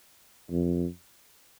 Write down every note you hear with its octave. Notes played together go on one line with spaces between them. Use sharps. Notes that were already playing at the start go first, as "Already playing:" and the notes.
F2